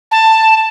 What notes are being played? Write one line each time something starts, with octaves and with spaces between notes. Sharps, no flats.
A5